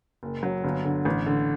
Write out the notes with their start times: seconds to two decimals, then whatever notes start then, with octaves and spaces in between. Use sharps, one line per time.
0.23 F#1
0.43 F#3
0.64 G1
0.85 D3
1.05 A1
1.26 D3